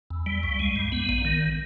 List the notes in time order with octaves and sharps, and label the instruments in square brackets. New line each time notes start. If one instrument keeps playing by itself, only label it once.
[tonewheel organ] E2
G3
C#2
G#3
G2
B3
A#1
D#3